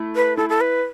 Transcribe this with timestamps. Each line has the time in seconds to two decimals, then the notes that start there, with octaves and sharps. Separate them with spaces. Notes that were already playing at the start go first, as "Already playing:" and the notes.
Already playing: A3 E4
0.16 B4
0.37 E4 A4
0.49 A4
0.61 B4